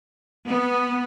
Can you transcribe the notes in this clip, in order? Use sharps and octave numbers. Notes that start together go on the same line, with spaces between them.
B3